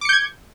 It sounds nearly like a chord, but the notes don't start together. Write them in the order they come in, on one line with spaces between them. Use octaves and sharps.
D6 C#7 G6 G#6